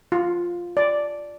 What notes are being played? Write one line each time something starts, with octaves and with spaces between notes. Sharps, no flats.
F4
D5